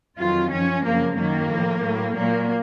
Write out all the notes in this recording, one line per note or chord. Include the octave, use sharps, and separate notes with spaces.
F2 D#3 F#3 F4
F#2 F3 C#4
F#2 C#3 F3 A#3
F#2 D#3 F#3 A#3
A2 F3
A2 F#3
A#2 F#3 A#3